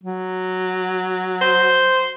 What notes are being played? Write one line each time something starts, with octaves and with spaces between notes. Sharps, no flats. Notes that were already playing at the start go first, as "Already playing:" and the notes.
F#3
C5